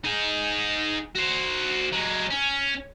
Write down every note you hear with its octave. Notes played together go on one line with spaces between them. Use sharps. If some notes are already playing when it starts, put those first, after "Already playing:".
D#4 G#4
F#4 C5
F#3 G#3
C#4